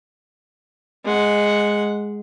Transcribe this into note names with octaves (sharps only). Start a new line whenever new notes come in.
G#3 F#5